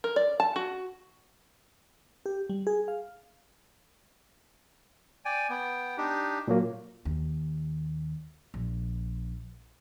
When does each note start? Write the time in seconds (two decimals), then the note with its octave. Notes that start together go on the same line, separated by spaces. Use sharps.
0.04 A#4
0.16 D5
0.40 A5
0.56 F#4
2.26 G4
2.49 G3
2.67 G#4
2.88 F5
5.25 D5 G5 G#5
5.50 B3 G5
5.97 D4 D#4 G4
6.48 A#2 F#3 A#3
7.05 D#2
8.54 A#1